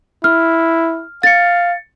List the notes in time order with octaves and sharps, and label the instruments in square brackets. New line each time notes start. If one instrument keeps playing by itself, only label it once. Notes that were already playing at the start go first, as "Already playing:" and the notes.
[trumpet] E4 [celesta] F6
[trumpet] F5 [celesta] A6 C#7